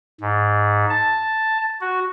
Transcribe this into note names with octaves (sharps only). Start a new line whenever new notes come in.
G#2
A5
F#4